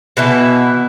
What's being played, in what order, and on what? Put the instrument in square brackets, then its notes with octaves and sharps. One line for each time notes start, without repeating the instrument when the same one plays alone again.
[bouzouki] B2 E3 E4